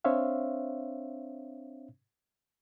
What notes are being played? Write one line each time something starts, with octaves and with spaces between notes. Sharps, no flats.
C4 D4 C5 C#5 E5 F5